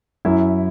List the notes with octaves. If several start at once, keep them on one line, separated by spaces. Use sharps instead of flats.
F#2 E4